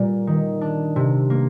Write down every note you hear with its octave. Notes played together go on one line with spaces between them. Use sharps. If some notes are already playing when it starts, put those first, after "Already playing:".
Already playing: A#2 G3
D#3
D4
C3
A#3